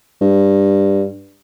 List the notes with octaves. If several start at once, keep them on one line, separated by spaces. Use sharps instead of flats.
G2